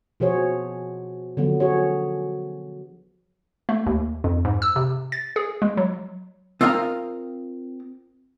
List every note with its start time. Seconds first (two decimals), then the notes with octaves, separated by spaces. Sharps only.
0.20 B2 F3 F#4 G#4 C5 C#5
1.37 D3 F3 F#3 B3
1.60 F#4 G#4 C#5
3.69 A3
3.86 D#2
4.24 F2
4.45 G#2
4.62 E6
4.76 C3
5.12 A6
5.36 G#4
5.62 G#3
5.77 F#3
6.61 C4 F4 A#4 D#5 F5 A#5